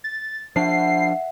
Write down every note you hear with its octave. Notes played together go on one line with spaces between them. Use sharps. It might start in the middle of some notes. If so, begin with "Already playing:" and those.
A6
F3 D4 E5 F#5 C7